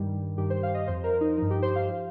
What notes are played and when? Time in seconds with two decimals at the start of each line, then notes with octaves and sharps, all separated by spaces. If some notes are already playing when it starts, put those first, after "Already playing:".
Already playing: G2 D#3 G3
0.37 G2 D#3 G3 G4
0.50 C5
0.63 F5
0.74 D#5
0.88 F2 F3 C5
1.04 A#4
1.21 D#4
1.37 G2 F3 D#4
1.50 G4
1.62 C5
1.76 F5
1.88 F3